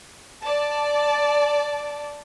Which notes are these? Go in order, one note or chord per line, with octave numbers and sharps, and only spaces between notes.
D5 A5